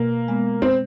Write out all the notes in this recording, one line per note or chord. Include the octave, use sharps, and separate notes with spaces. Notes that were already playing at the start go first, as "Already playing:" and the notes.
Already playing: B2 A#3
G#3 B3
C4